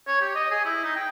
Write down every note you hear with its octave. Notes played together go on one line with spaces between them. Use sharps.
C#5
G4
D#5
G#4
E4
D#4
G5